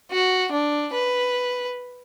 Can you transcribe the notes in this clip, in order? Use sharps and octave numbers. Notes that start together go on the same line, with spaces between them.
F#4
D4
B4